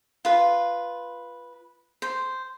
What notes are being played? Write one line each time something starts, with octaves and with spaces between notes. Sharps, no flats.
F4 B4
C5